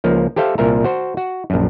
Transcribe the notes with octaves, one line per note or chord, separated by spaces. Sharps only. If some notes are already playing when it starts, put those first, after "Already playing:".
C#2 F3 A#3
G4 A4 C5 E5 F5 G5
C2 A#2 A#4 E5 A#5
F#4 C5
F#4
A#1 F#2